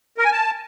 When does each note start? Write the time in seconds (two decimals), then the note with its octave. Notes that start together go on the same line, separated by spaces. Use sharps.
0.18 A#4
0.25 G#5
0.32 A5